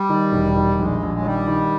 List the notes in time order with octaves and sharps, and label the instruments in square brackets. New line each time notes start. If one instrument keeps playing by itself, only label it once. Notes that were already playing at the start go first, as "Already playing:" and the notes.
Already playing: [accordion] G3
[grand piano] D#3
E1
D#3
[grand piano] A#1 [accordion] G#3
[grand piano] A#1
[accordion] F#3
[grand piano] D#3 [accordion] G3
[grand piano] D#3